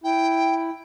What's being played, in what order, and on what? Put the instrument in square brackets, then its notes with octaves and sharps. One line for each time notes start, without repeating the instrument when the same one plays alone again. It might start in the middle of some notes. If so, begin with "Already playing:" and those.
[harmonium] E4 [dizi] G5